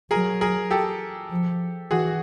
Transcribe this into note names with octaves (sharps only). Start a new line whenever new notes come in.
F#3 G#4 A#4
G#4 A#4
G4 A4
F3
E3 F#4 G#4